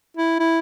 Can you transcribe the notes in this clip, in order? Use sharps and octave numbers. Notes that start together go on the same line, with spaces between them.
E4
E4